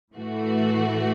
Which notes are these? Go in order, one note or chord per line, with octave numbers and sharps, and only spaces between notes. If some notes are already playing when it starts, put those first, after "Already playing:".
A2 E3 A3 F#4